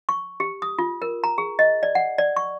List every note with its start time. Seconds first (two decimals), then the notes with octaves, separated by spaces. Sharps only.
0.09 C#6
0.40 G4
0.62 D#6
0.79 F4
1.02 A#4
1.24 A#5
1.38 G#4
1.59 D#5
1.83 D5
1.95 F#5
2.18 D5
2.36 C#6